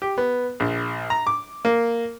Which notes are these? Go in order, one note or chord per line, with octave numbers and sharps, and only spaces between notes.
G4
B3
A#1
A#5
D6
A#3